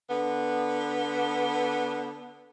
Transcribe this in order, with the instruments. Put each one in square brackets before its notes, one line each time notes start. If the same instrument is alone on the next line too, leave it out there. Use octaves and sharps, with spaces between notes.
[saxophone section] D3 B3